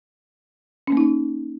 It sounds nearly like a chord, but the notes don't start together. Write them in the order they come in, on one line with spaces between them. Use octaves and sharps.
C#4 A#3 D#4